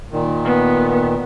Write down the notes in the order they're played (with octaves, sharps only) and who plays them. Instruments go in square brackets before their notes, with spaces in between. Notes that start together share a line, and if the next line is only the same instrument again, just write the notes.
[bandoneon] A#2 D#3
[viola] B3